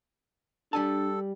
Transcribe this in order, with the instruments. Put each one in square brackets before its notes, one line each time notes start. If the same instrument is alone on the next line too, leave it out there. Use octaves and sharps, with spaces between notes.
[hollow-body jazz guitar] G3 G#5 A5 [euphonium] D4 [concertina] A4